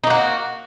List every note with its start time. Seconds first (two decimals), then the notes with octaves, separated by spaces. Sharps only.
0.04 D#4
0.07 A#3
0.10 F#4